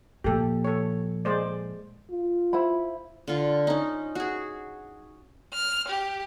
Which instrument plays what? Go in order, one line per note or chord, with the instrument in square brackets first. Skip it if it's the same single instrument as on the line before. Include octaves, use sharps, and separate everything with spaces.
[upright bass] A#2 F3 [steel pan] G4 A4
[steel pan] A4 C#5
G#3 C5 D5
[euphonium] F4
[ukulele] E4 C5 B5
[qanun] D3 F4
C#4 D#4
F#4 G#4
[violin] F6
G4